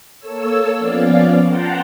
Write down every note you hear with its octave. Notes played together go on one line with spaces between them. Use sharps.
A#3 A4 C#5 E6
F3 B3 C#4 D5 F5
F#5 G5 A5 A#5 C6